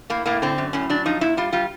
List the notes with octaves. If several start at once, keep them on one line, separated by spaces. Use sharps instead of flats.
A2 A#3
A2 A#3
D3 C4
F#2
A2 C#4
F#3 D4
F3 D#4
A#2 E4
G3 F4
G3 F4